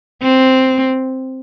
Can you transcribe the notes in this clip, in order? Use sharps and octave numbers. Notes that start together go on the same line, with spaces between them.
C4